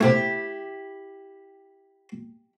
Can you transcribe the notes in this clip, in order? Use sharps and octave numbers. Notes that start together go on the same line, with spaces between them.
C3 A3 E4 G4